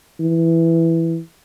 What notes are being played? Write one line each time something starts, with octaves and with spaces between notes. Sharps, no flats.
E3